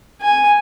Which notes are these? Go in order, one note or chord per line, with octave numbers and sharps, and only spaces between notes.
G#5